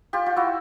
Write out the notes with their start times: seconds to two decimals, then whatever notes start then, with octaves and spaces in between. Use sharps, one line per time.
0.13 F4 G4
0.26 F4
0.36 E4 F#4